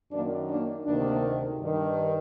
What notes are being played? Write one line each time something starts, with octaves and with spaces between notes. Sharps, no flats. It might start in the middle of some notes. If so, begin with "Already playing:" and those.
F#2 D#3 A#3 D4
A#3 D4
D2 C3 D#3 A#3 D4
G2 D#3